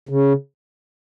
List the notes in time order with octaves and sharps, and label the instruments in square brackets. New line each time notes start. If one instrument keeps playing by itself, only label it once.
[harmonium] C#3